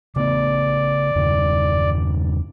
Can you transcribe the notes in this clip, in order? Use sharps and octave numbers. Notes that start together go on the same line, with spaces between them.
C#3 A3 B3 D5
E2 G2 C#3